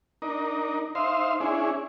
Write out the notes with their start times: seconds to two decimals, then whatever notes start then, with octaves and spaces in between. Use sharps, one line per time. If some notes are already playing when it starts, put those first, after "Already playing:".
0.22 D4 D#4 A#4
0.95 D#4 C5 E5 F5 C6
1.41 C#4 D4 E4 G#4